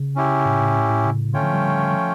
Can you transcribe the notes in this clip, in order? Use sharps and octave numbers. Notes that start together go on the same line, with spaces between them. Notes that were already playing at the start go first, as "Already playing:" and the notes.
Already playing: C#3
C#4 E4 G4
A2
A2
A2
A2
C#3
D3 A3 C#4 F4 C#5 G5
F3
G3
F3